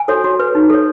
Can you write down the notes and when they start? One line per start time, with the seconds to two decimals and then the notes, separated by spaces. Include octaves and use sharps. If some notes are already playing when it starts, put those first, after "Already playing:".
Already playing: G#5
0.08 F#4 A4 C#5
0.24 F#4
0.39 B4
0.55 D#4
0.70 A4 C#5